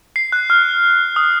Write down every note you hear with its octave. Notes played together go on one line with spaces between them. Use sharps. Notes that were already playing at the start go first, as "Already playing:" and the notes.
C7
F#6
F6
D#6